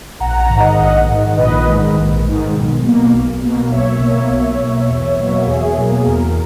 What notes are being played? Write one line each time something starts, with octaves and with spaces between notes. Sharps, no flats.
A#1 F#5 A#5
F#5 A#5
G#2 D#3
D#5 F#5
A#1 D#5 F#5
G#2 D#3
A#1 B4 D#5
G#2 D#3
A#1
G#2 D#3
B1
B2 A#3
B1
B2 A#3
B1 C#5 E5
B2 A#3
B1
B2 A#3
E2
B2 F#3 A#3
E2 G#4
B2 F#3 A#3
E2 A#4